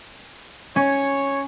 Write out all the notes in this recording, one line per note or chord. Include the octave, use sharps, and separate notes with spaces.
C#4 C#5